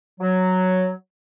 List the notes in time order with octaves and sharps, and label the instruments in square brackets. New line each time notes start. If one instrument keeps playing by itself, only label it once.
[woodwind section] F#3